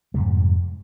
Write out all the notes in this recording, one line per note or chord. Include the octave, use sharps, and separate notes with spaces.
F2 G#2 C3 G3